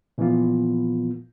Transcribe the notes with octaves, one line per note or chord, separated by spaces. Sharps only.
A#2 E3 F3 A#3 B3 F4